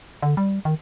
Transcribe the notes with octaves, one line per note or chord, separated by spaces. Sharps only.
D3
G3
D#3